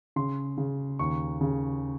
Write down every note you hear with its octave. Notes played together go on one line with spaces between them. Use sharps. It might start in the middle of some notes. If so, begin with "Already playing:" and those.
C#3 C6
C#3
D#2 C#6
C#3